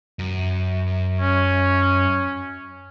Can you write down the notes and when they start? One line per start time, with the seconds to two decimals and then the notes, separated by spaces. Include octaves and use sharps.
0.19 F#2
1.21 C#4